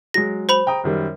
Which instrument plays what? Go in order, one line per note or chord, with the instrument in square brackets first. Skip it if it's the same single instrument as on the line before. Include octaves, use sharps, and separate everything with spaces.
[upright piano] F#3 G#3 [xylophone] A#6
[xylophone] C5 B5 F7
[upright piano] G5 A#5 D#6
F#2 D#3 G3